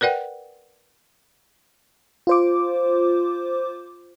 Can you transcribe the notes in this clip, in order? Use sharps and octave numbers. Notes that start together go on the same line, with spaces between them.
A#4 B4 D5 F#5 G5
F4 C5 D6